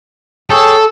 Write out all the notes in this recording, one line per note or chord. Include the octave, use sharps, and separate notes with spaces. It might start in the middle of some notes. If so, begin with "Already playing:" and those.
G#4 A4 C#5 G5